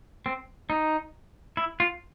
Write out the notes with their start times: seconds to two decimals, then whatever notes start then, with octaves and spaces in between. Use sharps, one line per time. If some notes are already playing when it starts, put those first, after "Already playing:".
0.26 C4
0.70 D#4
1.57 E4
1.80 F4